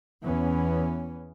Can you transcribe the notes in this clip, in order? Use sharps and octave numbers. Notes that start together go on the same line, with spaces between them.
E2 E3 B3 C#4